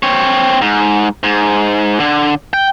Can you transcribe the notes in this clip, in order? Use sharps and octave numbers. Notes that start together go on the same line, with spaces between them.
C4 C#5
G#2
G#2
D3
G5